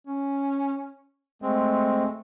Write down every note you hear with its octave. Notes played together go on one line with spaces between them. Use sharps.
C#4
G#3 A3 C4